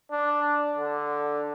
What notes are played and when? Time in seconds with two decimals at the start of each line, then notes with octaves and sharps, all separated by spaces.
0.12 D4
0.77 D3